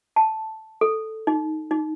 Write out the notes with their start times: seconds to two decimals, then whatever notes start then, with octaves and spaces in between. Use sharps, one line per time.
0.16 A5
0.81 A4
1.27 D#4
1.71 D#4